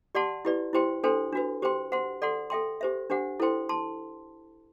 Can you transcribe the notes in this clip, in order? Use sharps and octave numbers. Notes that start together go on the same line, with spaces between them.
G4 D5 F#5 A5 C6
E4 G4 B4 D5
E4 G4 C5 G5 C6
D4 A4 C5 G5 C6
D4 F#4 B4
G4 C5 G5 C6
C5 F#5 C6
A4 D5 F#5 C6
A4 E5 G5 C6
G4 C5 E5
D4 G4 C5 F#5
E4 A4 C5 G5 C6
A5 C6